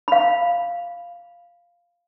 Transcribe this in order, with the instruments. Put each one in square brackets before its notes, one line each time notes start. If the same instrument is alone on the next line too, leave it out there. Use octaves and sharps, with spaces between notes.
[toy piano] F5 B5